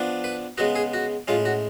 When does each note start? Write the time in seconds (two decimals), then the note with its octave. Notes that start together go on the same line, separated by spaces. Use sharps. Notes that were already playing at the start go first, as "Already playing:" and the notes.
Already playing: F3 B3 D4
0.24 B4
0.58 C#3 G#3 B3 F#4
0.76 G#4
0.94 F#4
1.28 A2 G#3 C#4 F4
1.45 F#4